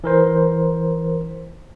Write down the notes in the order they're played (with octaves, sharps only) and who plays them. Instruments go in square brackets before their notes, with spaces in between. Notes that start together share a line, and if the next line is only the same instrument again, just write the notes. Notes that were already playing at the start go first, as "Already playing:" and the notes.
[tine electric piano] E3 A#4 C5